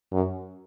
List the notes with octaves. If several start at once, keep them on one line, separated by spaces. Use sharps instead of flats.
F#2